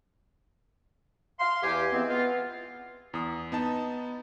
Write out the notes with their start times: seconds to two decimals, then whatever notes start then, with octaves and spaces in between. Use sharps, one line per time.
1.39 F5 C6
1.63 E2 G4 G#5
1.92 E3 G#3 B3 C4
2.10 B3 F4
3.14 E2 D#6
3.52 B3 D#4 A5